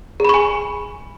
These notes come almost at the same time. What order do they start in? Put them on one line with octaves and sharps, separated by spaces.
G#4 B5 C#6 G#5